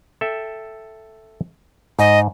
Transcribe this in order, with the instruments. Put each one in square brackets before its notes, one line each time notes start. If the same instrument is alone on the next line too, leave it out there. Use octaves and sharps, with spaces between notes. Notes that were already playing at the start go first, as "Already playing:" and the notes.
[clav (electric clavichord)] A4 E5 G5
[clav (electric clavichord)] G#2 [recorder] D#5